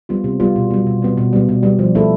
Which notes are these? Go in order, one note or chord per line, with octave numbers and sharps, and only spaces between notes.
G3 B3 F4
C3
G3 B3 F4
B2
G3 B3
B2
G3 B3
B2
G3 B3
B2
G3 B3
F3
A3 E4 A4